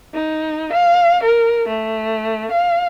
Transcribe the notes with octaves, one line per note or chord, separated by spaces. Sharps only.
D#4
F5
A#4
A3
F5